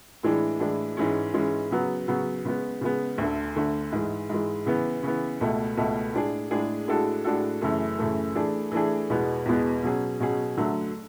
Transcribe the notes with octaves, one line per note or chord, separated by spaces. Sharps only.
A2 E3 G#3 D4
A2 E3 G#3 D4
G#2 E3 G#3 C#4
G#2 E3 G#3 C#4
C#3 F#3 B3
C#3 F#3 B3
C#3 G#3 B3
C#3 G#3 B3
D2 D3 A3
D2 D3 A3
G#2 E3 G#3
G#2 E3 G#3
C#3 E3 B3
C#3 E3 B3
C#2 B2 A3
C#2 B2 A3
A2 G#3 D4 G#4
A2 G#3 D4 G#4
A2 G#3 D4 F#4 A4
A2 G#3 D4 F#4 A4
F#2 C#3 E3 A3
F#2 C#3 E3 A3
E3 A3 D4 G#4
E3 A3 D4 G#4
E2 B2 G#3 B3
E2 B2 G#3 B3
B2 F#3 C#4 G#4
B2 F#3 C#4 G#4
D3 F#3 A3